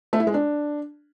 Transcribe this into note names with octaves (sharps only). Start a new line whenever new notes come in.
A3
E4
G#3
D4